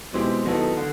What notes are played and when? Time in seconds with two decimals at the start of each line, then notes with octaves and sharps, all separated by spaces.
0.13 B2 G#3 C4 E4 G4
0.45 D#3 F#3 B3 E4 A4
0.77 D3